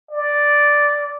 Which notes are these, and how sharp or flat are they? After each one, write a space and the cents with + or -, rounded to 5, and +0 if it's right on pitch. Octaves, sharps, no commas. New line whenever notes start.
D5 -5